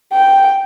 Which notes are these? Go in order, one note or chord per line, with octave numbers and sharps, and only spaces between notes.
G5